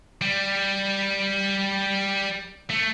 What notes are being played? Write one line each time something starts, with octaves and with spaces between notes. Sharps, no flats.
G3
A3